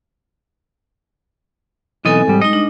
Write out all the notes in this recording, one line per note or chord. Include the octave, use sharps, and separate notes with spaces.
B1 E3 C4 A4 D#5 G#5
G#2 G3
G#3 D#4 D#5
D4